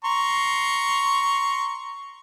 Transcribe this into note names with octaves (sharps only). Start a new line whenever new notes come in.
A#5 C6 C#6